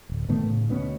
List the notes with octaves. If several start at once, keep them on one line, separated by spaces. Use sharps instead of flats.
D1
A#2 D#3 A3 B3
A2 C#3
D2 B2 B3 C#4